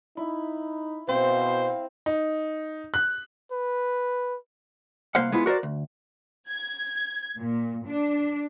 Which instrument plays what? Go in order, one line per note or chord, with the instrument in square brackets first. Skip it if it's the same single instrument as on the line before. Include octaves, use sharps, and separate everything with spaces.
[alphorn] D#4 [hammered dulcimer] E4
[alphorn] B2 [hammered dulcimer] C4 [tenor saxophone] C5 [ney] F5
[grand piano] D#4
F#6
[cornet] B4
[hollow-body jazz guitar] C2 A#3 C5 F5 F#5
G#3 B3 E4 F4
F#4 A#4 C5 D5
D2
[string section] G#6
A#2
D4